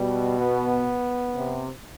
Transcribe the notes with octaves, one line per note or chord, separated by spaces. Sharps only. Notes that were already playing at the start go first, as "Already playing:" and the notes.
Already playing: B2 G3
B3
C3